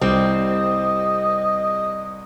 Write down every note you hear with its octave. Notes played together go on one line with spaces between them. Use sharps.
C2 G3 C4 D#5